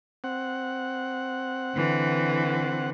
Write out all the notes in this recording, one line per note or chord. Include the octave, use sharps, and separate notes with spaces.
C4 F#5
D3 E3